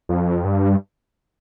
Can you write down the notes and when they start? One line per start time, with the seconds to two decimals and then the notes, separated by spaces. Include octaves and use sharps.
0.09 F2
0.45 G2